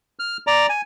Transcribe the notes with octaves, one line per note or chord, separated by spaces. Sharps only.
F6
D5 A#5
G#5